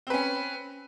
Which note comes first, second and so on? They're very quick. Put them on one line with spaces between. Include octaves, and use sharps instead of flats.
C4 B4 C#4